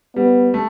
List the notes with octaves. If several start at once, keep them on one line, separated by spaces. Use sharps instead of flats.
G3 B3
A3